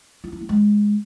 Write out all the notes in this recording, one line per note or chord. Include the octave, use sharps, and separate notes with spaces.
F4
E4
A#3
G#3